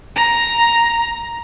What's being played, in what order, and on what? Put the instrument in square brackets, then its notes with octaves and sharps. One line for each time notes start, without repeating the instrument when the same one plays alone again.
[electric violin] A#5